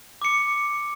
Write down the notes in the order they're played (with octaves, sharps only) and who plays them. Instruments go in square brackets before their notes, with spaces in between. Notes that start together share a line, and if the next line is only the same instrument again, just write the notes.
[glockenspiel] D6 C#7